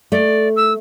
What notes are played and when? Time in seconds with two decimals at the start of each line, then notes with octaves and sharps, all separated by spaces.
0.12 A3 D5
0.56 E6